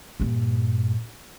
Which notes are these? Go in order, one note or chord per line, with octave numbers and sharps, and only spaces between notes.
G2 A#2